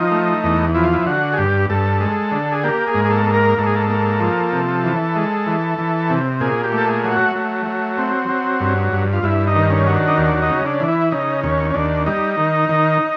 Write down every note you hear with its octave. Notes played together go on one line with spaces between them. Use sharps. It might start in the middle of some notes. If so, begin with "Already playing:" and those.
Already playing: F3 D#4
A3
E2
F3 E4
F4
E4
D3 F#4
G#4
G2 G4
G2 A4
G#3
D3
G#4
A#3 G4
G#4
G#2
G#4
A4
A#3
A#4
G#2 A4
G#4
A4
A#3
F3
C3
E3
G#3
E3
E3
C3
A#2 G#4
G4
A3
A4
G#4
F#3
F#4
A3
F#3
C4
F#3
G2
G2
F4
G2 E4
D#4
D#3
C#4
F#3
D4
D#4
D#2 D4
D#4
C#3
D4
E3
E4
C#3 D#4
D#2 C#4
C#4
D#2 D4
G3 D#4
D#3
D#3